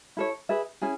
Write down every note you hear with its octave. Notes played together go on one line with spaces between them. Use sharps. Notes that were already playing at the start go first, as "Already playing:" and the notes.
E4 A4 C#5
G#4 B4 E5
C#4 E4 G#4